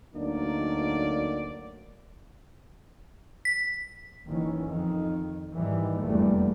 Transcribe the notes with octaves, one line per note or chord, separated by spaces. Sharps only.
D2 F#3 A#3 D4 D#4 D5
B6
F#1 D#3 E3 C#4
F2 D#3
G#2 D#3 E3 G3
F1 E2 G2 G3 A3 A#3